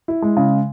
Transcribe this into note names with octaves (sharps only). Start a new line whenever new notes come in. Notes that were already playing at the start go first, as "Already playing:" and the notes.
E4
G#3
C#3